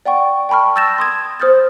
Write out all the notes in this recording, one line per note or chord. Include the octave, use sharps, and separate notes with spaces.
D5 F#5 G5 C#6
G5 A5 B5 C#6 F6
E6 G6 A6 A#6 E7
C6 D#6 G#6
C5 D#6 F6 G6 A6